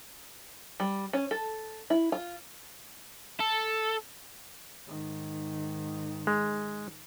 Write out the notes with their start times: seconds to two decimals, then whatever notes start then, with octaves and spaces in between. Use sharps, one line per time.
0.80 G3
1.13 C#4
1.31 A4
1.90 E4
2.12 F4
3.40 A4
4.87 G#2 D#3
6.27 G#3